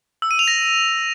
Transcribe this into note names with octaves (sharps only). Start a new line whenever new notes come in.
E6
D#7
F7
A#6